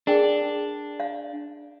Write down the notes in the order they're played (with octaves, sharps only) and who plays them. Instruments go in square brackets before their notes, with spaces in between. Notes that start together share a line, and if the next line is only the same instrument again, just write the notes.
[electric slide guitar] D4 [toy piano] G#4 A#4 G5
[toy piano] F5